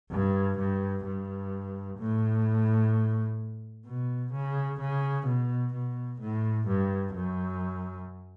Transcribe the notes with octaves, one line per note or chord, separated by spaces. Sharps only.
G2
G2
G2
A2
B2
C#3
C#3
B2
B2
A2
G2
F#2